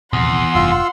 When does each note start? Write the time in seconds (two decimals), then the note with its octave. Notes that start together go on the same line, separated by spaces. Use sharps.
0.13 D#1 A#1 E2 C3 F#5 C6
0.55 F1 G2 F4 E6